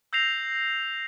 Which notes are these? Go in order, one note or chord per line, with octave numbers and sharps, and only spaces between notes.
E6 G6 A#6 C7 F7